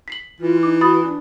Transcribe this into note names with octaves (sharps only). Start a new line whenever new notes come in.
B6 C7 F#7
E3 F4
D#4 D6
F#4 B5 D#6 A6
D4